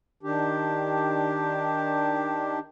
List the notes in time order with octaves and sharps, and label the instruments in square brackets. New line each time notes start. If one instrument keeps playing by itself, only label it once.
[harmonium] D#3 D4 G4